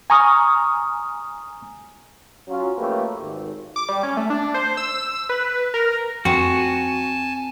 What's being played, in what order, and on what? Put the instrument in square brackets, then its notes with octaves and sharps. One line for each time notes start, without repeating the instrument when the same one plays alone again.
[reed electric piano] G#5 A#5 C#6 D#6 F6
[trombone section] F#3 C#4 F4
F3 A3 A#3 C#4 G4 B4
G#1
[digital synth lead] D6
G3
C#4
A3
D4
C5
E6
B4
A#4
[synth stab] F2 [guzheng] C4 [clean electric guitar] F#4 [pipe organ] G#5 A5